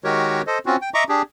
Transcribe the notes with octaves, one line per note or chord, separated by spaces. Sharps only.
D#3 G#3 F#4 G4 A#4 C#5
A4 C5 D#5
C4 C#4 F4 F#4
G5
D#5 E5 A#5 C#6 D6
D4 G4 G#4